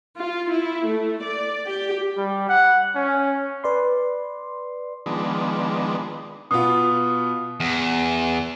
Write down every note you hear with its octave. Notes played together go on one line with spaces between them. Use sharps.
F4
E4
A3
D5
G4
G3
F#5
C#4
B4 D5 C6
D#3 F3 G#3 B3 D4
B2 B3 F4 D#6
E2